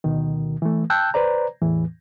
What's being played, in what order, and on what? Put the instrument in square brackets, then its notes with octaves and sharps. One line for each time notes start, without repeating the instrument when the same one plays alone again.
[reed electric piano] D2 B2 D#3
E3 A3
G5 A5 E6 F#6 G6
B4 C5 D5 A#5
E2 A2 E3